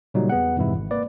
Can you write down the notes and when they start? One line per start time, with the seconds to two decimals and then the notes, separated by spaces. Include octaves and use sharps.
0.14 A#2 C#3 F#3 G3 A#3 D#4
0.30 E2 B3 G#4 F#5
0.57 F2 G#2 C3 E3 G#3 E4
0.76 G#1
0.91 A#3 B4 D5